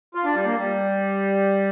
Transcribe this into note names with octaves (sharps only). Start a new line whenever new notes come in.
F4
D4
G3
A#3
G3